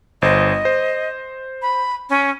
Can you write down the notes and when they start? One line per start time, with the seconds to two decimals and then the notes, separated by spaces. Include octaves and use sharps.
0.22 G1 C5 D#5
0.65 C5
1.62 B5
2.10 C#4